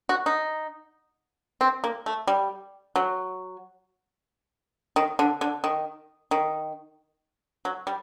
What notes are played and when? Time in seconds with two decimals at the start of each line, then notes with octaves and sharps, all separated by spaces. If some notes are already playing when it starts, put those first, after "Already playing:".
0.09 F#4
0.26 D#4
1.61 C4
1.84 A#3
2.06 A3
2.27 G3
2.96 F#3
4.96 D#3
5.19 D3
5.41 D3
5.64 D#3
6.31 D#3
7.65 F#3
7.87 G3